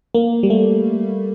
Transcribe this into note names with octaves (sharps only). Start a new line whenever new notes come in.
A#3
G3
A3